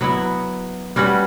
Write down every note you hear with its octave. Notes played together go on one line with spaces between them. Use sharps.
F#3 B3 E4
G3 C#4 F#4 B4